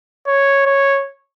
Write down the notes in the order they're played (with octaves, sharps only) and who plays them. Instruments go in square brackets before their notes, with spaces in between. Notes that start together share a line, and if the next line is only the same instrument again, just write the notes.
[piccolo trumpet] C#5
C#5